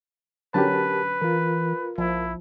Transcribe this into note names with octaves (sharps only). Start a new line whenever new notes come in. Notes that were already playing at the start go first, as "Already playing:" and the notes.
D3 F#3 C#4 G4 A#4 B4 A5
E3 F4 A#4
A#1 F3 E4